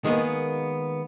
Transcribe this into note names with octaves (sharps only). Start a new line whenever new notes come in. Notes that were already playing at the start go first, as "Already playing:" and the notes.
D#3 G#3 A#3 B3 G#4